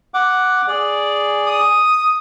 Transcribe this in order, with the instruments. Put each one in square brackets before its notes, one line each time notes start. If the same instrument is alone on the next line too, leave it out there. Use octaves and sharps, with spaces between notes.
[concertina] F#5 D6
G#4 D5
[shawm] D#6